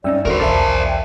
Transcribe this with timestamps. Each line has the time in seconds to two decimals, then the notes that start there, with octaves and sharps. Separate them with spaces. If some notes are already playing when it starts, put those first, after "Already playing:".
0.04 G2 C#4 D#4 D5 E5 G5 E6
0.25 G1 D#2 F#4 A4 A#4 C5
0.40 B1 E2 D5 E5 F5 G#5 A5
0.88 G5